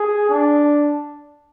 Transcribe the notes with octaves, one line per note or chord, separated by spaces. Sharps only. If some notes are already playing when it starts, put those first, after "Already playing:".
Already playing: G#4
D4